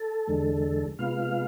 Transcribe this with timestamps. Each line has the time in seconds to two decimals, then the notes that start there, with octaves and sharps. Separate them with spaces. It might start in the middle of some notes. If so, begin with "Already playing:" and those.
Already playing: A4
0.27 E2 D3 G#3
0.99 C3 G#3 B3 F4 F5